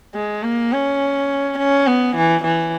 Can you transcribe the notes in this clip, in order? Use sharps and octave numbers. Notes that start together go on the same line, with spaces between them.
G#3
A#3
C#4
C#4
B3
E3
E3